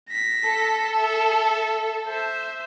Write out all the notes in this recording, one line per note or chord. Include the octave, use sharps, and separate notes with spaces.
A#6 B6
A4
E5
C5 E5